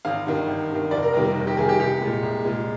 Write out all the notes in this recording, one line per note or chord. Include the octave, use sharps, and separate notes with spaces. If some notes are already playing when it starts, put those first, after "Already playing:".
G#1 F5
G2 D#3
G#1
G2 D#3
F1 D5
A#4
D#2 D#3 G3 A#4
A#4
F1
G4
D#2 D#3 G3 G#4
G4
C2 G4
A#2 G#3
C2
A#2 G#3